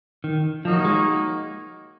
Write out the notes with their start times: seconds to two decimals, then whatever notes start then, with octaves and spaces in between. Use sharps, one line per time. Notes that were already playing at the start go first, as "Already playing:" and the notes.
0.24 D#3
0.64 F3 A#3 D#4 F#4 C#5
0.85 G#3